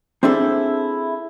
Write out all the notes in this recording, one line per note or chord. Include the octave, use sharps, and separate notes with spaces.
C4 D4 E4 G#4 A4